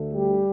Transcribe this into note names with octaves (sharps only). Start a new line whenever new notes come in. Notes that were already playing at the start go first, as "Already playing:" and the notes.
Already playing: D2 D3 A3
G3 G4